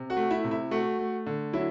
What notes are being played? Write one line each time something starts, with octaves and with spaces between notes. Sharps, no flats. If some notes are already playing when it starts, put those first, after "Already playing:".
Already playing: C3
F#4 F#5
A3
E4 E5
C3
E4 E5
A3 F#4 F#5
A3
D3
F#3 E4 E5